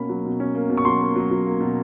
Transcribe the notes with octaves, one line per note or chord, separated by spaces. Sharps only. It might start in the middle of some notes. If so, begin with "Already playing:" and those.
Already playing: B2 A#3 C#4 B5
F#3
B2
C#4
A#3
B2
C#6
F#3 C6
A#3
F#3
F#3
A#3
B2